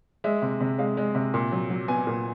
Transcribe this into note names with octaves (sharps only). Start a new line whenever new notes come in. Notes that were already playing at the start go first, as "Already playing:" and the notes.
G#3 E5
C3
C3
G#3 F5
G#3
C3
A#2
F#3
F#3
B3 G#5
A#2